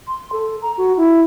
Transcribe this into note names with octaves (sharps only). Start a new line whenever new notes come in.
C6
A4
A#5
F#4
E4